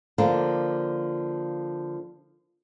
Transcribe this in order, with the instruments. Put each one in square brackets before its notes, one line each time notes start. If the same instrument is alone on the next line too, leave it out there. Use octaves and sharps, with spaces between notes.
[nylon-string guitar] D3 F3 A#3